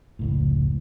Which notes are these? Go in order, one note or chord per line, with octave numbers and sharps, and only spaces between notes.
F1 C#2 A2